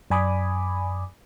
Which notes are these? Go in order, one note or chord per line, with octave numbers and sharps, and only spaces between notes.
F#2 D5 G#5 B5 D6 D#6